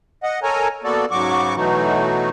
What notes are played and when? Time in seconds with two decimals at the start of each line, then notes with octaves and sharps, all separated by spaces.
0.23 D#5 F#5
0.43 A4 A#4 C#5 G#5 A#5
0.84 A#3 B3 F#4 A4 D5
1.11 G#2 C#3 F#3 F#4 C#6 D6
1.56 B2 E3 F#3 A3 D#4 F#4